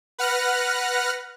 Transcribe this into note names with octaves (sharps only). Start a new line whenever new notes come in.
B4 F#5 F6 F#6 A#6